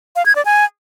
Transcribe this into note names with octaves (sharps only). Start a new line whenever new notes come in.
F5
G#6
D5
G#5